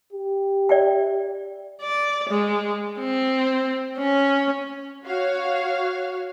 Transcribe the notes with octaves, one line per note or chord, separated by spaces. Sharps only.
G4
D5 E5 G5
D5
G#3
C4
C#4
F#4 C#5 F5